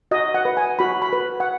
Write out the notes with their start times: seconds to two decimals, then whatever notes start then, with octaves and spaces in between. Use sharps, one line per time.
0.11 F#4 D#5
0.34 F#5
0.45 B4
0.57 G#5
0.79 F#4 B5
1.02 B5
1.13 B4
1.40 F#5